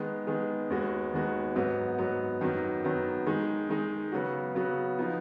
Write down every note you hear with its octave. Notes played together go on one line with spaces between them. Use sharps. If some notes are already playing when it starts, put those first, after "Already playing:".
Already playing: D#3 G#3 B3
D#3 G#3 B3
D#2 D#3 G#3 B3 F#4
D#2 D#3 G#3 B3 F#4
G#2 F#3 B3
G#2 F#3 B3
F#2 D#3 F#3 B3
F#2 D#3 F#3 B3
D#3 G#3 D#4
D#3 G#3 D#4
C#3 F#3 B3 F#4
C#3 F#3 B3 F#4
F3 B3 D#4